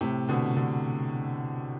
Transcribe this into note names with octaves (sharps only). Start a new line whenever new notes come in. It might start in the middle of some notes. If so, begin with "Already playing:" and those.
A2 C3
B2 D3
B2 D3